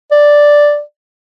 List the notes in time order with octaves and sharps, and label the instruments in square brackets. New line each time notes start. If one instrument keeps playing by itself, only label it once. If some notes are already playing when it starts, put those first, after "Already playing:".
[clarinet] D5